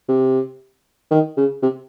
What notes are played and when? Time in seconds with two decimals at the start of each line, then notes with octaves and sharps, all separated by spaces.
0.08 C3
1.11 D#3
1.37 C#3
1.63 C3